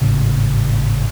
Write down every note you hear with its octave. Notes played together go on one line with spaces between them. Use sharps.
G#1 A2 C#3